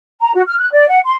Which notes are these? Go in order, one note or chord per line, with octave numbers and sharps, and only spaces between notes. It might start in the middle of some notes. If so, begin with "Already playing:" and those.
A#5
F#4
F6
F#6
D5
F#5
C6